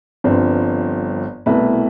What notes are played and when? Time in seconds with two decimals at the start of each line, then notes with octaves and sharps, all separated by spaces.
0.24 G1 G2 F3 C4
1.46 C2 B2 A3 E4 B4